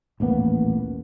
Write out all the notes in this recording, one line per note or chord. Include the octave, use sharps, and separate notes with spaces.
D#1 A1 A#3 B3